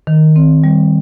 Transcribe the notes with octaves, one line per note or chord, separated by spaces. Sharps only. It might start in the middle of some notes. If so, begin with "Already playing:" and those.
D#3
C4
G3